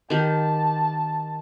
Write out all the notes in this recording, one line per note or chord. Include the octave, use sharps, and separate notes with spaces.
D#3 G4 A5